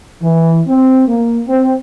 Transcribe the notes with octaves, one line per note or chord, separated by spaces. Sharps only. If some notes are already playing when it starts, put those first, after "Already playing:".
E3
C4
A#3
C4